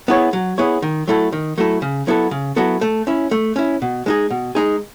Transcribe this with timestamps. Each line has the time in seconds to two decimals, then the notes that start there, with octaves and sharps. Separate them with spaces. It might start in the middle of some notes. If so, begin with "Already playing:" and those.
0.08 B3 E4 G#4 C#5
0.33 F#3
0.58 B3 E4 G#4 C#5
0.82 D#3
1.08 F#3 A3 E4 A4
1.32 D#3
1.58 F#3 A3 E4 A4
1.82 C#3
2.07 F#3 B3 E4 A4
2.31 C#3
2.56 F#3 B3 E4 A4
2.81 A3
3.07 C#4 E4
3.31 A3
3.56 C#4 E4
3.82 B2
4.06 G#3 D#4 G#4
4.30 B2
4.55 G#3 D#4 G#4